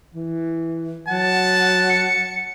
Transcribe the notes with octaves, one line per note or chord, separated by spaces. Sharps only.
E3
F#3 F#5 A5
C#7